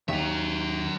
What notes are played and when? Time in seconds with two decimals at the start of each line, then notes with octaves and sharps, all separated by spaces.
0.09 D#2 F#3 E5